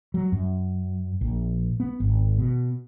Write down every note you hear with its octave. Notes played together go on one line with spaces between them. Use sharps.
F#3
F#2
A#1
B3
G#1
B2